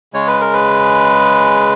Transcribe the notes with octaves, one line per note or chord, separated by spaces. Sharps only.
C#3 G#3 C#5
B4
A#4
B4